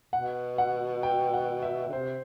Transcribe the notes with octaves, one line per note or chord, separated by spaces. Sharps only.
B2 F#5
F#5
G5
F#5
E5
D3
C3 C5